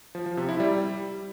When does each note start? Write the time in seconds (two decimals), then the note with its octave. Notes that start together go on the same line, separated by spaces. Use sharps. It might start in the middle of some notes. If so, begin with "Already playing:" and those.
0.15 F3
0.26 F3
0.37 C3
0.49 E4
0.60 G3